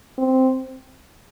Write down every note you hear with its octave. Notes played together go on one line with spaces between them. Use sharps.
C4